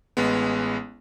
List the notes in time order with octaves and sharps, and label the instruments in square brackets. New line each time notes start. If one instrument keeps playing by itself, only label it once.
[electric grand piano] A1 G#3 B3